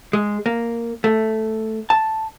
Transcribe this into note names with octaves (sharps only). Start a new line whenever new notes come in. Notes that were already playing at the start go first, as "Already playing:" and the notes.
G#3
A#3
A3
A5